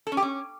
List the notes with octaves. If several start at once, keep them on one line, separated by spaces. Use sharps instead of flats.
A4
C#4
G4
C#4